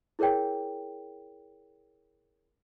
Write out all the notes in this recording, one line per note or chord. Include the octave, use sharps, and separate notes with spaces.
E4 G#4 A#4 C#5 G5